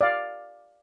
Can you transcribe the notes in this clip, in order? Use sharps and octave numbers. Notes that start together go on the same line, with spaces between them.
D5 F5